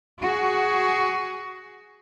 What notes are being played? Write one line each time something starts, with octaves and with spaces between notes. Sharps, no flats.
F#4 G#4